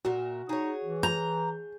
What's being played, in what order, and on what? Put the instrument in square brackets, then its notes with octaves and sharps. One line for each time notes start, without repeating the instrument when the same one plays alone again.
[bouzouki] A#2 A#4 E5 [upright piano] F#4
[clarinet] D#4 [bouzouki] G#4 C#5
[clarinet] E3
[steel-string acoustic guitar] A#5 [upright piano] G6